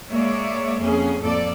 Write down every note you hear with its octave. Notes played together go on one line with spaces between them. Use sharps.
G#3 A#3 C#5 D5 E5
F2 A#3 C#4 G#4
F2 A2 A#3 A4 D5